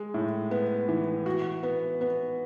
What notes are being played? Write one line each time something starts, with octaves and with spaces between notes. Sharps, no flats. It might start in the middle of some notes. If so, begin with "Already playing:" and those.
Already playing: G#3
A2
B3
E3
F#4
B3
B3